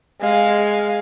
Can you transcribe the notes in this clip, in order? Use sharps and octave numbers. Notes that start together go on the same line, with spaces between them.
G#3 F5